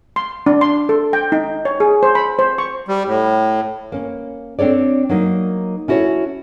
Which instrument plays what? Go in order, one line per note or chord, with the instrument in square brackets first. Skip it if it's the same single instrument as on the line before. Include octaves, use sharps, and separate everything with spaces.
[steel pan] C6
D4
C6
A4
G5
D#4
C#5
G#4
C5
B5
C5
C#6
[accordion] G3
A2
[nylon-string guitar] A#3 C#4
C4 D4 A4 C#5 D5
F#3 A#3 D#4
C#4 E4 F#4 A4 C#5